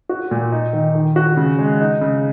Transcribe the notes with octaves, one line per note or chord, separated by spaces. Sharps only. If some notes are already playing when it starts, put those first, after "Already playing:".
F#4
A#2
D#4
D#3
D#3
F#4
C#3
G#3
D#4
C#3